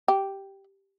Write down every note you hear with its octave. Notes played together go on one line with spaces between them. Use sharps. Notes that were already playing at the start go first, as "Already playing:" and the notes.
G4